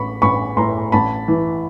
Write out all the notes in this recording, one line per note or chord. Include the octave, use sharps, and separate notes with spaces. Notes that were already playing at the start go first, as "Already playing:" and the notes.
Already playing: A1 B5 C#6
A1 B5 C#6
A2 A#5 C6
A1 A5 B5
E3